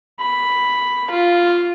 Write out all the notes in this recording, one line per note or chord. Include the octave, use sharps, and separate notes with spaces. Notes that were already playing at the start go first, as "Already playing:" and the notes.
B5
F4